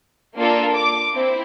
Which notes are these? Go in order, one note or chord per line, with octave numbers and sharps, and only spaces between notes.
A#3 D4 F4 A4
D6
C4 E4